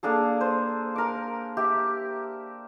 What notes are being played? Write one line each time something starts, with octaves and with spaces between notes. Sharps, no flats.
A#3 D4 G#4 A4
C5
A#4 D6
G4 E5